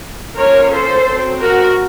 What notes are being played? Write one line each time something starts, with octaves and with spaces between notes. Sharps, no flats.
F3 A#3 C#4 A#4 C#5
A4 C5
F#3 C4
F#4 A#4